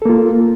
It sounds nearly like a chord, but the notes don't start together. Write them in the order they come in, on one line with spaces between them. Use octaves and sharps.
A4 A#3 F4